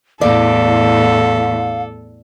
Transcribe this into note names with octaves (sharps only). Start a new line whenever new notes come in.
E2 A2 A4 D5 F5